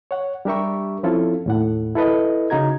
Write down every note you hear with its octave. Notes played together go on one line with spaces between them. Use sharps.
C#5 F#5
G3 D4 G4 A#4 E5 C#6
F3 C4 C#4 E4 F4 A4
D#2 A2 F#5
E4 A4 B4 D#5
C#3 D#4 F#4 A#5 G#6